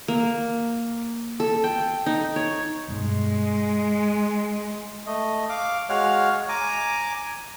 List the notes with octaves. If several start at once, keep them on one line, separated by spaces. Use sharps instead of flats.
A#3
A4
G5
D#4
C#5
G2 B2 G3 G#3
A3 D#5
F5 D6
G#3 F#4 C#5 F5 F#5 F6
G#5 A#5 D6